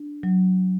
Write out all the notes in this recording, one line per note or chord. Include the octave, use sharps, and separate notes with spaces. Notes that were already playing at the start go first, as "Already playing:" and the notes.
Already playing: D4
F#3